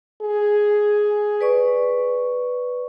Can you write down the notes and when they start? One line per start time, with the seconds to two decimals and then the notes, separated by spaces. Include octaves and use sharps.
0.21 G#4
1.41 B4 D5 C#6